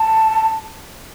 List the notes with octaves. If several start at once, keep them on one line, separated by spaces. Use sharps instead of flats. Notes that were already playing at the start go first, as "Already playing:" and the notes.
Already playing: A5